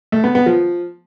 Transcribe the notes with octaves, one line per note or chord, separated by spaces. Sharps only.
A3
B3
B3
F3